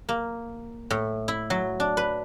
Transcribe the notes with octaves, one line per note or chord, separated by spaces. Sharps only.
A#3
A2
E4
F#3
D4
B4